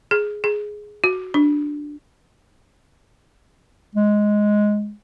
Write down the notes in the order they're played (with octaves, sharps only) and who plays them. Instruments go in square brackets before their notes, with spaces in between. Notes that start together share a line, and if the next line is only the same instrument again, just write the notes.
[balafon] G#4
G#4
F#4
D4
[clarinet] G#3